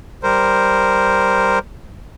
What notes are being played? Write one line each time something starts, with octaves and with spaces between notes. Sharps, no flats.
G3 A#4 C5